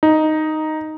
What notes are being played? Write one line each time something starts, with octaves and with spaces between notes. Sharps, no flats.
D#4